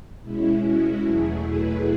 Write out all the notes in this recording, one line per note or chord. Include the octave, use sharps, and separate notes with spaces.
B2 G#3 C#4 E4
F#4
E2 B2 F#3 A3 E4 G#4
B4